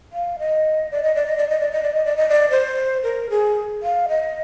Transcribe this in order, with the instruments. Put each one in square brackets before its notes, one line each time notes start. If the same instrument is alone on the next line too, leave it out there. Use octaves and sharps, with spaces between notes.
[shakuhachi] F5
D#5
D5
D#5
D5
D#5
D5
D#5
D5
D#5
D5
D#5
D5
D#5
D5
C5
A#4
G#4
F5
D#5